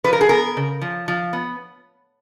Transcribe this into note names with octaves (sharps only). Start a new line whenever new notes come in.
F3 B4
A#4
G#4
B3 A#4
C#3
F3
F3
B3